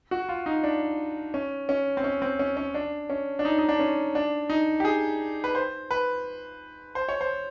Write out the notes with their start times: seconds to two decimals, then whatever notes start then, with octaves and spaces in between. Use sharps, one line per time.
0.11 F#4
0.29 F4
0.46 D#4
0.63 D4
1.34 C#4
1.69 C#4
1.97 C4
2.04 C#4
2.22 C4
2.39 C#4
2.57 C#4
2.74 D4
3.10 C#4
3.39 D4
3.45 D#4
3.59 D#4
3.69 D4
3.80 C#4
4.15 D4
4.50 D#4
4.80 G4
4.85 G#4
5.44 B4
5.55 C5
5.91 B4
6.95 C5
7.09 C#5
7.21 C5